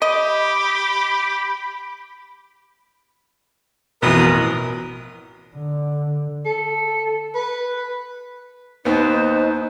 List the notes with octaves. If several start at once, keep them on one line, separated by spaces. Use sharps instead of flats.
G4 D#5 B5
A1 F2 B2 E3 B3 A#4 D#6
D3
A4
B4
D#2 B3 D#4 C5